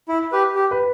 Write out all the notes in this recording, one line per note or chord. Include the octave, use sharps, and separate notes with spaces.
E4
G4 B4
G4
B4